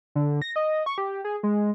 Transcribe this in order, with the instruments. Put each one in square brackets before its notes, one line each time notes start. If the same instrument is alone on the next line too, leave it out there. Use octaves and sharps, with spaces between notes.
[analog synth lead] D3
A#6
D#5
C#6
G4
G#4
G#3